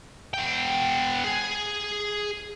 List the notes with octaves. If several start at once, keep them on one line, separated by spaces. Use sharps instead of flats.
B3 G5
G#4